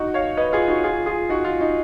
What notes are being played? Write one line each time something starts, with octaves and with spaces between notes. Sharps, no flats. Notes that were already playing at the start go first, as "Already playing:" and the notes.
Already playing: D#4 F#4
C#5 F5
B4 D#5
F4 G#4
D#4 F#4
F4 G#4
F4 G#4
D#4 F#4
F4
D#4